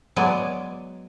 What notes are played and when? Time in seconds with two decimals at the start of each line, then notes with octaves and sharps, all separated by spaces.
0.16 F#3 G#3 B3 D5 G#5